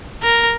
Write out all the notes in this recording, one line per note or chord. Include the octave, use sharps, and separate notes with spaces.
A#4